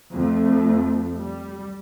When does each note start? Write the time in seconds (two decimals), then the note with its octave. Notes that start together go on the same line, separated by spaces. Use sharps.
0.13 F2 A3
1.20 G3